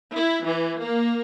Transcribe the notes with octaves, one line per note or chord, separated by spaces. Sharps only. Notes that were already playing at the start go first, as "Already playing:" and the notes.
E4
E3
A#3